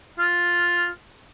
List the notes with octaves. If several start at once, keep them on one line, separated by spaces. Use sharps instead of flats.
F4